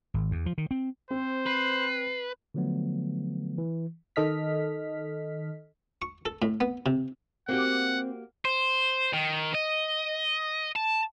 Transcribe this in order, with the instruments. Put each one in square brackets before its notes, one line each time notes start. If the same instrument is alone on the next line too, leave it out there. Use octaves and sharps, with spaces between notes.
[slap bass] G#1
E2
F3
D#3
C4
[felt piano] C4 [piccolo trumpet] C5
[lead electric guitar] B4 [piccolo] C7
[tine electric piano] D3 F3 F#3 A3 B3
E3
[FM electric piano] D#3 A4 D#5 F6 B6
[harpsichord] C#6
A4
A2
B3
C3
[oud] A#3 F#4 G4 [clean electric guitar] C4 [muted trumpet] F#5
[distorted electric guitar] C5
D#3
D#5
A5